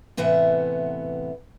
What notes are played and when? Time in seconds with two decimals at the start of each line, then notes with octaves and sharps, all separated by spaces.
0.17 A2 C3 E3 B3 E5 F#5